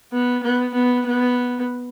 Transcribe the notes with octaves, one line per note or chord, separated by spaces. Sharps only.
B3
B3
B3
B3